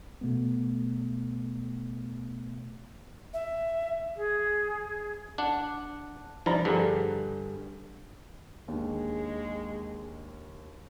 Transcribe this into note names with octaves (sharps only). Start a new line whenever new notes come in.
B2 A3 B3
E5
G#4
D4 F#5
E3 F3 D4 A#5
G2 D3 G3 G#4
D#2 G#3 D4